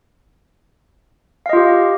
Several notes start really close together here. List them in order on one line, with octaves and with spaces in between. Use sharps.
F5 D#5 F4 G4